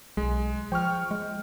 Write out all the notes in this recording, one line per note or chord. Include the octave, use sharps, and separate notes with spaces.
B1 G#3
F3 G5 C#6 F6
G#3